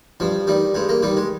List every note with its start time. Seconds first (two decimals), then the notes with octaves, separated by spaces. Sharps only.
0.20 G2 F3
0.47 D#3 G3
0.75 G2 G#3
0.89 A#3
1.03 D#3 G3
1.17 G#3